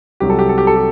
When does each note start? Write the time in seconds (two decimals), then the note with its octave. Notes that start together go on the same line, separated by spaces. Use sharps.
0.20 C2 C3 F#3 G4
0.30 A4
0.39 G4
0.49 A4
0.58 G4
0.67 A4
0.76 G4